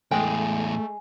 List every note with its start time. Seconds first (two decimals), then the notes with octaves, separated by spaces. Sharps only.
0.11 E2 A2 G#3 A3 G5 G#5